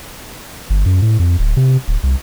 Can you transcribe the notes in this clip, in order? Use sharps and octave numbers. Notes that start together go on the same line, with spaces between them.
G1
F#2
A2
F2
D1
C3
D1
C2